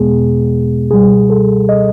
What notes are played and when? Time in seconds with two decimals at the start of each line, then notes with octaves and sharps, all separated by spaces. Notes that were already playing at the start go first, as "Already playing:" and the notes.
Already playing: E2 B2 G#3 B3 G#4
0.91 C#2 B2 G3 G#4
1.30 A4
1.69 D#5